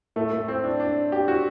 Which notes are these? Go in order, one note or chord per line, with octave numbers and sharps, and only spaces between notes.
A2 A3
A3
C4
D4
D4
G4
F#4